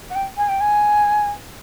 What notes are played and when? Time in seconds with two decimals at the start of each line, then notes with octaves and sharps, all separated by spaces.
0.09 F#5
0.15 G5
0.37 G#5
0.48 G5
0.60 G#5